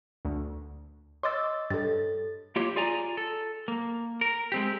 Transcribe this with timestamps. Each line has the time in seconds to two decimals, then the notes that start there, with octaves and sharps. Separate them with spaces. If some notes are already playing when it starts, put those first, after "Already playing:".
0.25 D2
1.23 C#5 D#5 C6 D6 E6 A6
1.70 G2 A4 A6
2.56 A#3 F4 G4 C#5
2.76 F4 G#4 D5 G#5 A#5
3.17 A4
3.68 A#3
4.21 A#4
4.52 G#3 C4 G4